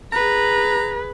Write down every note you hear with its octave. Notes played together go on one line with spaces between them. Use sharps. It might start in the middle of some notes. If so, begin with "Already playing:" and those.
G#4 B4 A#5